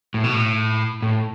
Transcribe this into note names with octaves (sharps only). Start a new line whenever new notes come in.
A2
B2
A2
A2